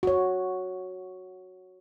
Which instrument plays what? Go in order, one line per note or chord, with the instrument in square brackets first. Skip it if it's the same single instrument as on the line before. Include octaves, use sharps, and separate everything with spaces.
[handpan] F#4 C#5